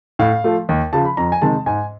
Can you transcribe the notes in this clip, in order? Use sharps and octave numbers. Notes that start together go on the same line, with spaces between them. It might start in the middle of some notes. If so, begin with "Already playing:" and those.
A2 F5
F3 A3
D#2
C#3 F3 A5
B5
F2 A#5
G#5
C3 D#3 G#3 A5
G#2 G#5